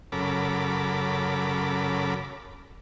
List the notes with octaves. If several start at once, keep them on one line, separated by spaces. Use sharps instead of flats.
F#2 C#3 A4 A#4 B5 D6